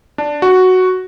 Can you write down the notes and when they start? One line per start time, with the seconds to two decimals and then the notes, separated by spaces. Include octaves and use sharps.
0.18 D4
0.42 F#4